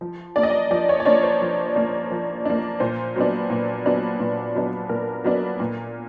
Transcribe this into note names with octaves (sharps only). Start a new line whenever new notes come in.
F3
A#3 D4 D5
D#5
D5
F3 D5
C#5
D5
A#3 D4 C#5
C5
F3
A#3 D4
F3
A#3 D4
A#2 C5
F#3 B3 D4
A#2
F#3 B3 D4
A#2
F#3 B3 D4
A#2 A#4
F#3 B3 D4
A#2